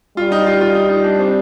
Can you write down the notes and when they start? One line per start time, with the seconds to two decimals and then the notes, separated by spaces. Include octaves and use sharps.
0.17 G3 F4
0.32 D#4
0.46 F4
0.61 F4
0.75 D#4
0.89 D#4
1.04 D4
1.19 C4